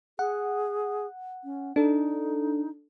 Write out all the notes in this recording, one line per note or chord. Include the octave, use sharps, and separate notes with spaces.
G#4 F#5
C#4
D4 D#4 A4